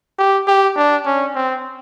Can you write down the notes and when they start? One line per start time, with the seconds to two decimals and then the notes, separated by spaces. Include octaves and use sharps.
0.18 G4
0.47 G4
0.77 D4
1.06 C#4
1.35 C4